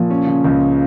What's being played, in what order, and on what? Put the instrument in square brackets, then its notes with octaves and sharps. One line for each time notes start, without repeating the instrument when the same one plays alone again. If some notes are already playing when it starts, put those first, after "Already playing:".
Already playing: [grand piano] A#2 [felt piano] F3
[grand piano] C#4
C#3
C#2